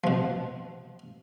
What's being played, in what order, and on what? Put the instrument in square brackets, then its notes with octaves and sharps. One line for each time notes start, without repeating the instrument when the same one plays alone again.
[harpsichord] B2 F3